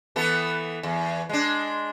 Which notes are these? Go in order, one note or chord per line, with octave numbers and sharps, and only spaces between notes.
E3 B3 A4
E2
G#3 D4